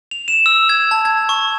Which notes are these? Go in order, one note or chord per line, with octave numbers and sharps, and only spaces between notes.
F7
E7
E6
G#6
A5
G#6
C#6